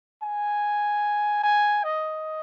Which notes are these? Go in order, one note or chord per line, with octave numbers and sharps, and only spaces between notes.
G#5
G#5
D#5